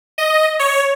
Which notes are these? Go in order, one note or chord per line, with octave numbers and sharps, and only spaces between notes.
D#5
C#5